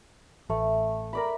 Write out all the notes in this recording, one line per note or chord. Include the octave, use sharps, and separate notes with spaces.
A1 A3
A#4 D5 B5